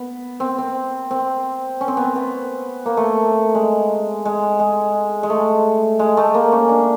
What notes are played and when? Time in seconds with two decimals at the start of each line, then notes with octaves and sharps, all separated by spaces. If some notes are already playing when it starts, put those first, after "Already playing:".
Already playing: B3
0.40 C4
0.59 C4
1.11 C4
1.81 C#4
1.88 C4
1.97 B3
2.04 C4
2.16 B3
2.86 A#3
2.97 A3
3.55 G#3
4.25 G#3
4.60 G#3
5.23 G#3
5.30 A3
5.99 G#3
6.17 A3
6.34 A#3
6.52 C#4
6.69 D4